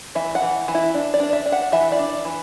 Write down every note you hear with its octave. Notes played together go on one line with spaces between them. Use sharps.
E3 E5
F#5
E3
E3
E4
D4
D5
D4
E5
D4
F#5
E3 E5
D5
D4
E3